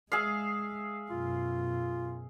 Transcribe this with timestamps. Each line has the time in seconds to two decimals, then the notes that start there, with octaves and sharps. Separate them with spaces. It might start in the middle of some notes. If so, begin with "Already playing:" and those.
0.12 G#3 G#4 E5 F5
1.10 F#2 B2 F4